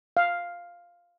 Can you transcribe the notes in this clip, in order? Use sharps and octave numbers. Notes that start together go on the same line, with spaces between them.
F5